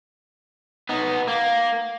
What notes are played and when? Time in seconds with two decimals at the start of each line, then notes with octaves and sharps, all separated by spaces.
0.89 B3 D#4
1.27 A#3